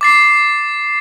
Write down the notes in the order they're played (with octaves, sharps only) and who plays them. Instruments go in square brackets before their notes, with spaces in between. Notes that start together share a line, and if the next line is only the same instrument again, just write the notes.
[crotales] D6 A6 C7